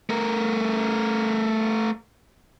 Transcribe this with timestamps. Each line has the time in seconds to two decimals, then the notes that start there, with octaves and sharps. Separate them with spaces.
0.10 A3 A#4